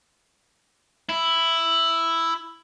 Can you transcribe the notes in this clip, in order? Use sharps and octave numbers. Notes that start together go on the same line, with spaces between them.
E4